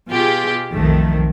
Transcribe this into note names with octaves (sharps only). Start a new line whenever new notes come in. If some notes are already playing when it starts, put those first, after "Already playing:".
B2 F4 G4 G#4
B1 F2 D#3 A3